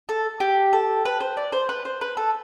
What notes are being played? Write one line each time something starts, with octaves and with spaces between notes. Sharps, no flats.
A4
G4
A4
B4
C5
D5
C5
B4
C5
B4
A4